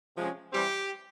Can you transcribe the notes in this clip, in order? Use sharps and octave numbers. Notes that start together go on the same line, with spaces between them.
C3 F3 G#3 C#4
E3 G3 C4 G4